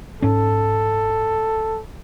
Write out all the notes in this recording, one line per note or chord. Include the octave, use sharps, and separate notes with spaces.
G#2 C#4 A4